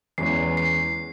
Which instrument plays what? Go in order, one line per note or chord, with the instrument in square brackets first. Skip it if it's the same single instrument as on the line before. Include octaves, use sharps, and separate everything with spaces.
[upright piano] E2 E3 G#3 C#4 [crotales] C7
[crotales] C7